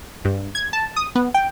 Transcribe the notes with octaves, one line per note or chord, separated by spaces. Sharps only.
G2
G#6
A5
D#6
B3
G5